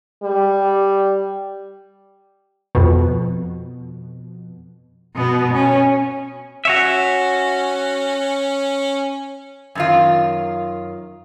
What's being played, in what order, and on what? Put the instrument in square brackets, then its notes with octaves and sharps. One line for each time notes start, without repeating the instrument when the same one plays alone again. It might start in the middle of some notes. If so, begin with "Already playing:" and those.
[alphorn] G3
[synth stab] F2 B2
[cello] B2 B3
C#4
[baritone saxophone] C#4 [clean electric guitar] F#4 C#5 E5
[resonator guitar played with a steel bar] F#2 D#3 F4